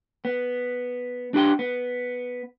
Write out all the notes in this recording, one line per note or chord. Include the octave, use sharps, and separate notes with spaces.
B3
D4 G4 G5 C6
B3